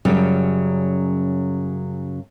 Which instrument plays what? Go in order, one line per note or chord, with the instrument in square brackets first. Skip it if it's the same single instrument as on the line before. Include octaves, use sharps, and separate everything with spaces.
[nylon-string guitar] F#2 C#3 F#3 G3